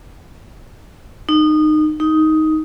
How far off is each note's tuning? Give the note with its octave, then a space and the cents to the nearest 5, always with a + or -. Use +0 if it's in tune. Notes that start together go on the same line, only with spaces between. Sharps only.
D#4 -25
D#4 +10